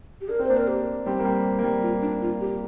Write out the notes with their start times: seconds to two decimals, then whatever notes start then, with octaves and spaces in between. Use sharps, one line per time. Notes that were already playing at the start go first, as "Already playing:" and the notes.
0.21 G4
0.29 D4 A#4
0.39 C4
0.45 A#3 D4 C5
0.57 A#4
0.67 G4
1.06 G3 C4 G4
1.20 A#3
1.25 G3
1.59 A#3
1.63 G3
1.83 F4
2.02 D4
2.22 F4
2.41 G4